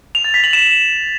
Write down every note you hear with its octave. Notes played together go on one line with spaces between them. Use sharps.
F7
A6
B6
F#7
E7